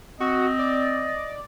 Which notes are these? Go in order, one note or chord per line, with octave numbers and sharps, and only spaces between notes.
C4 F#4 D#5
D5